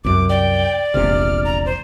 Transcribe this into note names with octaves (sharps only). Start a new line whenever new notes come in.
C2 F#2 D6
D5 G5
E1 A#1 C3 F6
A#5
C5